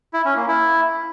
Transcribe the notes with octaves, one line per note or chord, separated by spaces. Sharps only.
E4
C#4
A#3
E4